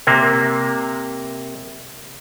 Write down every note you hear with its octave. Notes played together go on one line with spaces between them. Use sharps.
C3 A#3